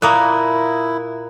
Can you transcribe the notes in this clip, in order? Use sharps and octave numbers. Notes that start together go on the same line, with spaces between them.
A#2 A#3 E4 A#5 D#6 F#6